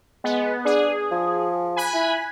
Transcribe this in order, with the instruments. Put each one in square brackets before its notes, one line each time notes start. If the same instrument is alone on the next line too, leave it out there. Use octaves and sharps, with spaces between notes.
[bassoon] G#3 [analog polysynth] B3
[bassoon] D4 [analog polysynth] G#4
[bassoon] F3
[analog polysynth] G#5 B5 F#6
[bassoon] E4